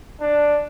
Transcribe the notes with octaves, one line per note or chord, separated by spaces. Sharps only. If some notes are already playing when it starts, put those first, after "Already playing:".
D4